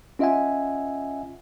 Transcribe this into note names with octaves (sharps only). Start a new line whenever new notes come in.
C#4 F4 D#5 E5 F#5 G#5